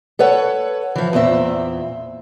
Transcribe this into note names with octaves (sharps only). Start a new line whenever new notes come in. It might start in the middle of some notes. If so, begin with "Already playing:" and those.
A4 B4 C#5 F#5
E3 F3
E2 A#2 C4 E5